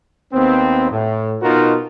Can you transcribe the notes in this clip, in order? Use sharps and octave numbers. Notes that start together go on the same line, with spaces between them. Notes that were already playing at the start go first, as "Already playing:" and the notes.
D#2 B3 C4
A2
B2 D#4 F4 F#4 A#4